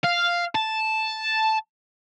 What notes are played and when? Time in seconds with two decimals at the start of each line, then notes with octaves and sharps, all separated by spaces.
0.04 F5
0.55 A5